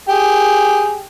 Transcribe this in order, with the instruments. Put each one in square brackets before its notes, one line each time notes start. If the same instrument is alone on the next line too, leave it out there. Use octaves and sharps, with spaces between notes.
[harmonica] G4 G#4